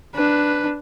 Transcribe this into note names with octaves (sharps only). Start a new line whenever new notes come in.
D4 B4